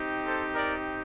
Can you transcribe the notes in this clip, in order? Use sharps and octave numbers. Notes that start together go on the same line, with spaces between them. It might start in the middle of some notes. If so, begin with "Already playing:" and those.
Already playing: C4 D#4 G4
A4 C5
A#4 D5